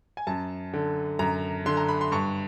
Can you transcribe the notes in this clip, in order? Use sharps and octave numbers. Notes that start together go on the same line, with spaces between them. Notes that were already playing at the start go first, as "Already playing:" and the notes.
G#5
F#2 A5
D3
F#2 A#5
D3 C6
A#5
B5
C6
G2 C#6